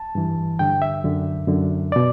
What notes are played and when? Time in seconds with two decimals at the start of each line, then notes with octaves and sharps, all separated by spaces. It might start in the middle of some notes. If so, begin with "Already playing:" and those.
Already playing: A5
0.15 G2 E3
0.59 G2 D3 G5
0.82 E5
1.04 F#2 D3
1.48 F#2 D3
1.92 B2 D5